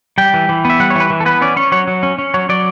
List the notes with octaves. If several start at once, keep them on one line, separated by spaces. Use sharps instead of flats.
G3 G5
E3
E3
B3 E5
G3 F#5
C#5
E3 B4
E3
A4
B3 B4
C#4 D5
C#4 C#5
F#3 C#5
F#3
C#4
C#4
F#3 C#5
F#3 D5